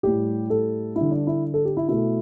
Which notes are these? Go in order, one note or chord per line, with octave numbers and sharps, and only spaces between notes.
A2 G3 G4
A4
D3 G3 E4
D4
E4
A4
G4
E4
B2 A3 E4